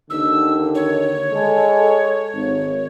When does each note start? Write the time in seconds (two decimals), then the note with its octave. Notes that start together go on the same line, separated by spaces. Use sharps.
0.10 D#2 D3 D#3 E6
0.75 C#5
1.31 G#3 A4
2.34 G#1